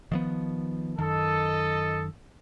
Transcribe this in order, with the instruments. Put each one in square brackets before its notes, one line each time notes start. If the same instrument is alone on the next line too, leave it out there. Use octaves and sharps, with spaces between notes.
[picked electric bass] D#3 F3 B3
[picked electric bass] F#2 D#3 [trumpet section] A4 D#5